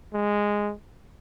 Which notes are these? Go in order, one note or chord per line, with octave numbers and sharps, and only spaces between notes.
G#3